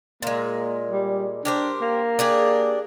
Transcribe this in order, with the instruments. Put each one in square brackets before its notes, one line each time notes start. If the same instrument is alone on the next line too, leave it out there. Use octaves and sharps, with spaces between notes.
[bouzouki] A#2 G#3 [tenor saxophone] A#3
[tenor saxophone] G3
[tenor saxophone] D4 [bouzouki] G4 A#4 C5
[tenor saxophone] A#3
[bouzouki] D4 G4 G#4